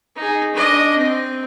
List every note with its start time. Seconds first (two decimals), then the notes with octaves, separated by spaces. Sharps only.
0.16 D#4 G#4
0.54 D4 D#5
0.98 C4